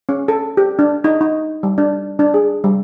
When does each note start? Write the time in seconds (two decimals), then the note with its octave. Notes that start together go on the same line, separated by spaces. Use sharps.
0.09 C#4
0.28 A4
0.57 G4
0.79 D4
1.04 D#4
1.21 D#4
1.63 G3
1.78 D4
2.19 D4
2.34 G#4
2.64 G3